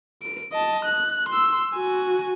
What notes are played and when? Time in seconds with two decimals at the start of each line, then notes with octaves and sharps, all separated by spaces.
0.22 D7
0.52 D#5 A5
0.85 F#6
1.29 C6 E6
1.75 F#4 G#5